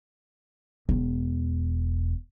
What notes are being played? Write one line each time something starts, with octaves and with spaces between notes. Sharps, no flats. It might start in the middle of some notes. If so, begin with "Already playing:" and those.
E1